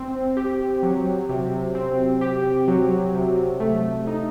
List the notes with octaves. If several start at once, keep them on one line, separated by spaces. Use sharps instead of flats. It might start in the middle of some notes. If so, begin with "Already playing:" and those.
Already playing: C4
G4
F#3
C3
C4
G4
F#3
C3
A3
D#4